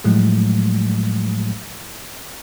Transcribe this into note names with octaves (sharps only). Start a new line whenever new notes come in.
A2 F3 F#3 G#3 A3